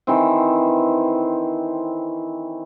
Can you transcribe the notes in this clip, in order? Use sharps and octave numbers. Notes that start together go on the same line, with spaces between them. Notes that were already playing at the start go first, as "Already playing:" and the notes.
D#3 E3 C4